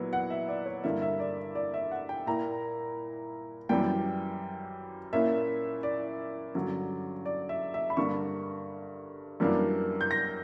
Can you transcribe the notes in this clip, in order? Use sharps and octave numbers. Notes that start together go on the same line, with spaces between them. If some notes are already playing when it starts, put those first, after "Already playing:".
Already playing: A#2 F#3 B3 E4
F#5
E5
D5
C#5
G2 D3 A#3 E4 E5
E5
D5
D5
E5
F#5
G5
A#2 A#3 E4 A#5
F#2 E3 G3 G5
A#2 A#3 C#4 E4 E5
D5
G2 D3 F#3 C#4
D5
E5
E5
B5
G2 D3 A#3 D4 C#6
F#2 E3 G3 A#3 D4
G6
A#6